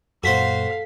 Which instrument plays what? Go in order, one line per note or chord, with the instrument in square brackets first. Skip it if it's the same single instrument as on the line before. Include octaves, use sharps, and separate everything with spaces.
[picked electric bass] F#2 A#2 [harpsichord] F#4 C5 F#5 [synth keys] A4 B6 [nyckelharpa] F5